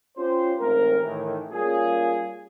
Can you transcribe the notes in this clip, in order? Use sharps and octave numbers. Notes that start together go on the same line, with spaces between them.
C#4 F4 G4 C5
A1 G#2 A3 C4 A#4
A2 D#3 E3
G3 A#3 C#4 F4 G#4